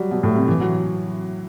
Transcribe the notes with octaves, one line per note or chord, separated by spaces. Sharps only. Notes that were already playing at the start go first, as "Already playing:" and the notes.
Already playing: F#3 G3
B2
A2
C3
E3
F#3